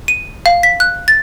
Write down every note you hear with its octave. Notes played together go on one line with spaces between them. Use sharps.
D#7
F5
B6
F#6
A6